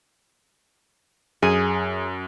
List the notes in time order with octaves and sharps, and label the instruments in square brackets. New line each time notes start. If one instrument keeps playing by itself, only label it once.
[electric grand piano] F#2 [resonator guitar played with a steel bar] G#4